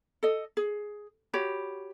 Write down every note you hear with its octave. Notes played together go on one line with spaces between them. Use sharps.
A4 D#5
G#4
F#4 G4 C#5 B5